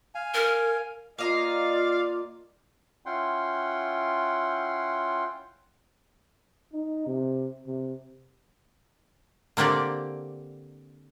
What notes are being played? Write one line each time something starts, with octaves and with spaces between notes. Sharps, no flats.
F5 G#5
A#4
A#3 F4 D5 D#5 F5 A#5
C#4 E4 F4 F#5 G5 C6
D#4
C3
C3
D3 A#3 C4 G4 D5